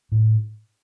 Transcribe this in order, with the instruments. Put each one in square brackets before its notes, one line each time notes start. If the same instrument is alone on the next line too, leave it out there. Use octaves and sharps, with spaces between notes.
[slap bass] A2